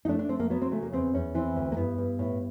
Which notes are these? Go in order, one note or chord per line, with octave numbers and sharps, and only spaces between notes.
D#4
A3 D4
D4
A3 C4
A#3
F#3 B3
C4
C#3 A3
A#3
E2 C4
E2 C#4
E3 C4
D2
A#3
G2 B3
G2
A2